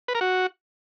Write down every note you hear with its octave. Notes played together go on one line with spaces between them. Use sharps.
B4
A#4
F#4